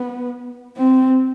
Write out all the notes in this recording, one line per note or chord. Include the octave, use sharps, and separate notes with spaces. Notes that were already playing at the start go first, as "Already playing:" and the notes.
Already playing: B3
C4